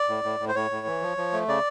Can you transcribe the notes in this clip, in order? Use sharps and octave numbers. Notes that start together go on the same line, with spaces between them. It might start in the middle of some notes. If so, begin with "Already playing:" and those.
Already playing: D5
A2
A2
A2
C5
A2 C#5
A2
E3
F3
F3
A3
C#3 D5